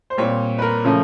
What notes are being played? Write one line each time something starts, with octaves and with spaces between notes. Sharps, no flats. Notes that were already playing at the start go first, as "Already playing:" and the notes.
C5
A#2 G3 C4 C#5
B4
A#4
C#3 F3 A3 C#4